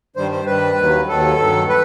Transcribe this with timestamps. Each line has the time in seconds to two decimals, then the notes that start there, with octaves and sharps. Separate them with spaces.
0.16 G2 D#3 G3 C5
0.31 C5
0.46 G2 D#3 G3 B4
0.78 D#2 D#3 F#3
1.08 D#2 D#3 F#3 A4
1.39 G2 D#3 F#3
1.69 B4